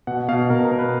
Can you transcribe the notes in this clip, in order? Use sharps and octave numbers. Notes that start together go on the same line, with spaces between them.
B2 F#5
B2 F5
B2 A#4
A#4
B2
B4